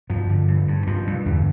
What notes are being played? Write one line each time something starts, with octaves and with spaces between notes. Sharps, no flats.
G2 F3
D3
G2
G2
G2 F3
G2
E2 D3